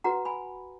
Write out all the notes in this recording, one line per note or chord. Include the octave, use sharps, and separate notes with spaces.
F#4 B4 F#5 A#5
G#5 B5